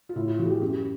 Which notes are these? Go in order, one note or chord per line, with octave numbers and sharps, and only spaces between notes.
F4
A2 E4
F4
E3 F#4
G#4
G4
F#2 G4